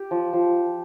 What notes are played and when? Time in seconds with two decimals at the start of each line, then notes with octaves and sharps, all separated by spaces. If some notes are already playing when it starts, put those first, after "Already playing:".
Already playing: G4
0.11 F3
0.33 F3